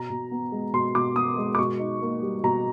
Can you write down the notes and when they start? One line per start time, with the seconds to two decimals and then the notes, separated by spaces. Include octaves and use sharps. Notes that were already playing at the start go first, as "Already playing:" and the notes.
Already playing: B2 A#5
0.10 B2
0.31 B3
0.52 G#3
0.73 B2 C6
0.95 B2 D6
1.16 B3 D#6
1.38 G#3
1.55 D6
1.59 B2 C#6
1.79 D#4
2.02 A#3
2.22 G3
2.43 B2 A#5